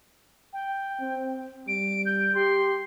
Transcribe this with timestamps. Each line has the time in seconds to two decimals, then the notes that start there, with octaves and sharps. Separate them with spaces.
0.52 G5
1.01 C4
1.67 G3 D7
2.05 G6
2.34 G4 C6